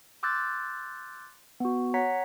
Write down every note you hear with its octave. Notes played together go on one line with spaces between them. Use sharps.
C6 D6 E6 F#6 G6 A6
B3 F#4
C#5 F#5 A#5 B6